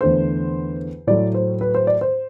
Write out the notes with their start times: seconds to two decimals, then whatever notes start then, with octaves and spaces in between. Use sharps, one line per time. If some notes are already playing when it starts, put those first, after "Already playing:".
0.01 E2 D3 A3 C5
1.07 A2 F#3 A3 D5
1.35 C5
1.61 B4
1.75 C5
1.87 D5
2.01 C5